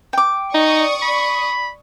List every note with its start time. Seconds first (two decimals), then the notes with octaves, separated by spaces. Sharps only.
0.13 G5 D6
0.55 D#4 D5 C#6 D#6
1.02 B5